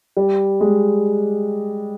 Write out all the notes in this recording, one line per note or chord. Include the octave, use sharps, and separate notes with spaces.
G3
G#3